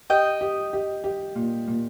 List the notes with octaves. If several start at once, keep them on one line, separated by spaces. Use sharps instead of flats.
G4 D#5 G5
G4
G4
G4
A#2
A#2